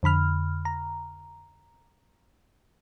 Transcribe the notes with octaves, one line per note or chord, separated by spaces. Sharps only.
F2 D3 B5 F6
A#5